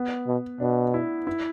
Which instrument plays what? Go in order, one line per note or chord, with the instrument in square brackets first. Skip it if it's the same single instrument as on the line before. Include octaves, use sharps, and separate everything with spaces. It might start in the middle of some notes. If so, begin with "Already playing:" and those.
Already playing: [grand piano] B3
[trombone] B2
[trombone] B2 [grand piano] D4
[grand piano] E4
E4